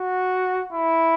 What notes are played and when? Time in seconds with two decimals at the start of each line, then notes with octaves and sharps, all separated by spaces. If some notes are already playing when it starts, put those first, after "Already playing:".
Already playing: F#4
0.72 E4